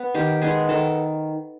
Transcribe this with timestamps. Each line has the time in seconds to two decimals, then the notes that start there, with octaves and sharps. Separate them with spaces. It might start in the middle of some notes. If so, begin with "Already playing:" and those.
Already playing: B3
0.14 D#3 G4
0.42 G#3 B3 G#4
0.69 D#3 A4